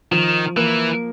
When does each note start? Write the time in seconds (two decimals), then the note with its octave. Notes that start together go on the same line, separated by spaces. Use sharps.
0.11 D#3 F3
0.56 E3 A#3